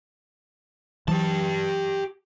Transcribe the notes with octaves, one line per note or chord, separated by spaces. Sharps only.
E3 F#3 G4 A5